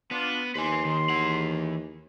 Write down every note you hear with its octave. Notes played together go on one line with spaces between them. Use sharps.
B3 D4 F4
D#2 B4 G#5 C6
D#3
E3 F#5